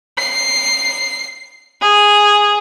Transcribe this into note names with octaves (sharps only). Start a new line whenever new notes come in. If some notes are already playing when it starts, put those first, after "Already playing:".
C7
G#4